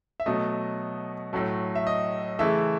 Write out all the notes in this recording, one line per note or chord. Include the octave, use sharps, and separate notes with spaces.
E5
B2 F#3 A3 D#5
A2 F#3 A3
E5
D#5
C#3 E3 A3 E5